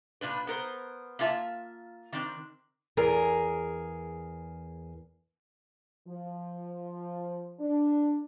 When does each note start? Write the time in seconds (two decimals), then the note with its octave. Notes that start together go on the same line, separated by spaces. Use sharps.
0.21 A#2 D4 B4
0.47 B3 A#4 C5
1.19 A#3 D4 F4 E5 A5
2.13 D#3 C4 D4
2.97 E2 G#4 A#4
6.08 F3
7.60 D4